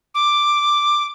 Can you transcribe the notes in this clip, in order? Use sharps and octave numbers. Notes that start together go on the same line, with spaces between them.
D6